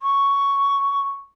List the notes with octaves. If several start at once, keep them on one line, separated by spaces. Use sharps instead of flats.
C#6